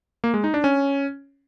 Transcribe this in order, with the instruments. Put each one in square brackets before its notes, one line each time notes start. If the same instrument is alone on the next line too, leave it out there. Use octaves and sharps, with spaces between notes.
[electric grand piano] A#3
G#3
D#4
D4
C#4